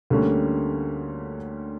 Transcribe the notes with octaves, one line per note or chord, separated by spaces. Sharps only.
D2 D3 G3 A#3 C#4